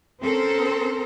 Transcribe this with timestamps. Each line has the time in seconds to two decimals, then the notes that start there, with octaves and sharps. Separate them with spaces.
0.21 C4 C#4 A4 A#4 C5